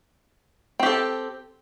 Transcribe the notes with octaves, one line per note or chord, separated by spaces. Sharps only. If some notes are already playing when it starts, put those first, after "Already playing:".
C4 G4 A4